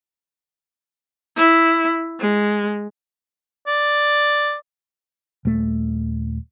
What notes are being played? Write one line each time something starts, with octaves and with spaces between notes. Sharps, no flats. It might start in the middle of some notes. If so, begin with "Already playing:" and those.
E4
G#3
D5
D#1 A3